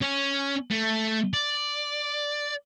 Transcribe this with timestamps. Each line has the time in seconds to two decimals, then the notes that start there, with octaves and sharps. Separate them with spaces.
0.01 C#4
0.70 A3
1.34 D5